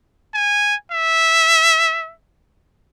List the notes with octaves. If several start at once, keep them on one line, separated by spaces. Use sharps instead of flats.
G#5
E5